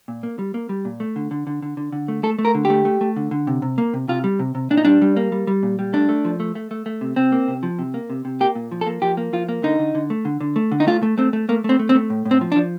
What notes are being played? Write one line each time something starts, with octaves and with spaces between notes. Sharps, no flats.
A#2
A#3
G3
A#3
G3
A#2
A3
D3
D3
D3
D3
D3
D3
A3
A3 A4
A3
A#4
D3
G4
A3
A3
A3
D3
D3
C3
C3
A#3
C3
C3 F4
G3
C3
C3
A#2 D4
D#4
G3 D4
G3
A#3
G3
G3
A#2
G3
A3 D4
A3
F3
A3
A3
A3
A3
C3
C3 C4
A#3
C3
F3
C3
A#3
C3
C3
A#3 G4
A#2
F3
A4
A#3
F3 G4
A#3
F3 F4
A#3
D3 D#4
D3
D3
A3
D3
D3
A3
D3
D#4
A3 F4
A3
A3 C4
A3
A3 A#3
A3 C4
A3
C4
A3
A2
A2
C4
F3
D4
F3